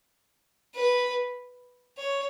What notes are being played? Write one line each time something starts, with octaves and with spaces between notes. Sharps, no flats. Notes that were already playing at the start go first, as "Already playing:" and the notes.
B4
C#5